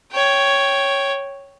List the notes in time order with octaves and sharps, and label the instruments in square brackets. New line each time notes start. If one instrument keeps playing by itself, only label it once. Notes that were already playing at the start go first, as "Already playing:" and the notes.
[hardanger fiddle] C#5 G5